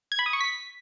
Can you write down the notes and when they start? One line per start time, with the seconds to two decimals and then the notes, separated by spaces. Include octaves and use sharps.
0.12 G#6
0.19 B5
0.26 D#6
0.33 C#6
0.41 B6